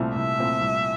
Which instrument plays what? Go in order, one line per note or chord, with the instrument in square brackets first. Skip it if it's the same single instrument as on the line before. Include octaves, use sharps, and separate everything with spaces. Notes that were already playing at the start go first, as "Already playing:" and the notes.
Already playing: [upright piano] C2 A#2 A3 C4 E4
[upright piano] C2 [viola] E5
[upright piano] A#2 A3 C4 E4
C2